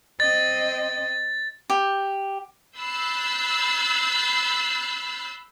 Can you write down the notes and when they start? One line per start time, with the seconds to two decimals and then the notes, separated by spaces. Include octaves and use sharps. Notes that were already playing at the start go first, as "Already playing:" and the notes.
0.20 C4 D#5 A6
1.70 G4
2.78 B5 E6 F#6 G6 A6 C7